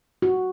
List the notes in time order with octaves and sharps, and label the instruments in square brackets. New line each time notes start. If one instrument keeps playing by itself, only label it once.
[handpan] F#4